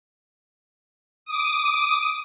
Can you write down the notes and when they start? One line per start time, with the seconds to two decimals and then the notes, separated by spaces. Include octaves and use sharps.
1.25 D6 D#6